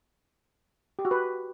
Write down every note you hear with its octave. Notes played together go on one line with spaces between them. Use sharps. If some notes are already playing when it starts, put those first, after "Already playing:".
G4
F#4
B4